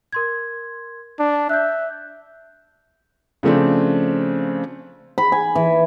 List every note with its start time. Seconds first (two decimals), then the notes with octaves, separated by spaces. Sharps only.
0.12 A#4 C6 G#6
1.19 D4
1.49 E5 F#6 G6
3.43 C#3 F3 A3 C4 D4
5.18 B5
5.32 G#5
5.55 E3